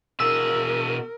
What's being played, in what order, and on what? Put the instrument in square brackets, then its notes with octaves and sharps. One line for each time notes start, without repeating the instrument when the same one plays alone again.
[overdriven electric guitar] B2 G#4 [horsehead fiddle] A#4 [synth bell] E6